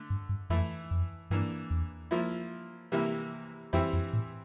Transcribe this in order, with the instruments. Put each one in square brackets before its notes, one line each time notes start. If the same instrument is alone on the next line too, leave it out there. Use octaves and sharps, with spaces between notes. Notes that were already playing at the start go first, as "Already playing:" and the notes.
Already playing: [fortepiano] D3 A3
[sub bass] G2
G2
[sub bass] F2 [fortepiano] E3 A3 E4
[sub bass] F2
[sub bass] G2 [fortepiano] E3 A#3 D4
[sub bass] E2
[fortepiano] F3 A#3 E4
C3 E3 G3 A#3 E4
[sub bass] F2 [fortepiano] E3 G3 C4 E4
[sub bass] F2
A2